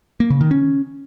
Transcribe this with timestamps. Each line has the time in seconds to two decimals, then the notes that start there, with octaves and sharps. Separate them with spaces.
0.20 A#3
0.30 C#3
0.41 D#3
0.51 C#4